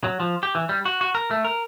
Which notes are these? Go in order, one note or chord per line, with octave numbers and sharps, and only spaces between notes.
F#3
F3
G4
E3
G3
F#4
F#4
A#4
A3
A#4